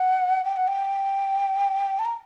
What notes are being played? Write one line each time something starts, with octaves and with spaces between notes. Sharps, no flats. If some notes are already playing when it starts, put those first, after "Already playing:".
Already playing: F#5
G5
F#5
G5
A5
A#5